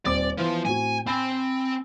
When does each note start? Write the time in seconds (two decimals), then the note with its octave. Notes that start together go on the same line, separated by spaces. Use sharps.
0.05 D#1 C4 D5 D6
0.38 E3 F3 B3
0.65 A2 C4 F#4 G#5
1.07 C4 G#5 B5 A6